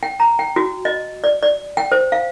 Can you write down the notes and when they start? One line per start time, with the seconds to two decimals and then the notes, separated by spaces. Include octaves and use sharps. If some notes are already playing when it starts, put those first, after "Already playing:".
0.03 G5
0.20 A#5
0.39 G5
0.56 F#4
0.85 D#5
1.24 D5
1.42 D5
1.77 G5
1.92 C5
2.12 F5